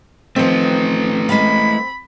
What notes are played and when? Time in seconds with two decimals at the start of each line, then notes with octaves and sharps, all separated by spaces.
0.36 D#3 F3 A3 C4 B4
1.29 G#3 E4 F5 B5